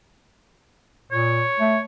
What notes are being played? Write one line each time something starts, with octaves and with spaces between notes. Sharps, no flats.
A#2 C#5
A3